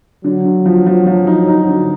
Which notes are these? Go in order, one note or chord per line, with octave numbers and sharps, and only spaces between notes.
D3 F#3
D3
F3
F3
F3
D#4
D#4
D3